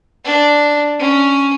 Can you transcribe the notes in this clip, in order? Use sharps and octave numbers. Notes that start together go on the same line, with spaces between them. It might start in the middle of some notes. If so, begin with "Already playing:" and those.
D4
C#4